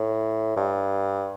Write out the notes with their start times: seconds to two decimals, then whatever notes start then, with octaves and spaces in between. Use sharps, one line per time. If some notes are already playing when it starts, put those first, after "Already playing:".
Already playing: A2
0.57 G2